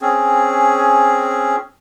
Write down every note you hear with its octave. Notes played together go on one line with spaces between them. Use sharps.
C4 C#4 G#4